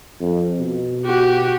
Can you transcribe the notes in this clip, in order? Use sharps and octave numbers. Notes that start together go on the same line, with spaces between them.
F2
B2
F#4 G4